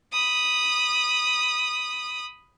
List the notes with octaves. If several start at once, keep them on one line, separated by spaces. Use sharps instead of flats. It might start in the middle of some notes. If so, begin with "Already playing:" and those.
B5 D#6